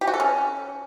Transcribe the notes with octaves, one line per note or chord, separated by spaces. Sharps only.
G4
F#4
A4
C#4